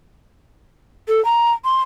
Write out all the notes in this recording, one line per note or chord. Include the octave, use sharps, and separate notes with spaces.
A4
A#5
C6